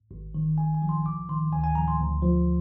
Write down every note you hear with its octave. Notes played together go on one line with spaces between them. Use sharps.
G#1
D#3
A#1 G#5
G#5
F3
C6
C2 D6
D#3 C6
D2 G#5
G#5
F3 A#5
C6
D2
F3